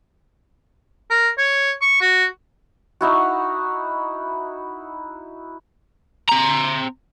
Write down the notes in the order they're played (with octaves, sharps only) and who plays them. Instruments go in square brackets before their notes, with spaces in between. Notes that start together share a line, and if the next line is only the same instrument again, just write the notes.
[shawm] A#4
C#5
C#6
F#4
[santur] D#4 E4 F#4
[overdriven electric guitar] C4 A#5